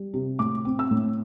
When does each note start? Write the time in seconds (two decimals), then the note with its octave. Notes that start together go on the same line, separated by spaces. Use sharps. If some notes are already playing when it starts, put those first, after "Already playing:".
Already playing: G3
0.14 C3
0.39 A2 D6
0.65 C4
0.79 E6
0.91 A2